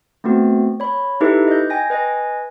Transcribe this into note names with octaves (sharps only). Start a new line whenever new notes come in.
A3 B3 C4 F#4
C#5 B5
D#4 E4 G4 A4 B4 E5
D#5 G6
G5 G#5 A#6
B4 D#5 G#5